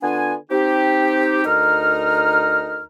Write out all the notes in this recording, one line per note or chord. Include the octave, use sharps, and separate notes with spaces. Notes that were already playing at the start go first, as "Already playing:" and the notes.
D3 B3 D4 F4 G#5
C4 D#4 G4
D2 D#4 A#4 A#5 F6